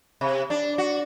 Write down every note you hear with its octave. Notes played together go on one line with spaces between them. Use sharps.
C3
D4
F#4